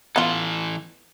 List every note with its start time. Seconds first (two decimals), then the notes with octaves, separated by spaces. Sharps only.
0.16 E3 B3 F4 A4